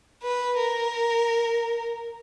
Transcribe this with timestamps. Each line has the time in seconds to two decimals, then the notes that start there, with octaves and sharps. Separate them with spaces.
0.22 B4
0.58 A#4